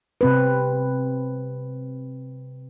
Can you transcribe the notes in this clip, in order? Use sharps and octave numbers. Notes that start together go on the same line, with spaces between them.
C3 C4 B4